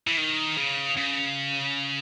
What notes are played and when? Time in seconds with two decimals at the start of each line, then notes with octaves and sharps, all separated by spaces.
0.07 E3
0.18 D#3
0.57 C#3
0.97 C#3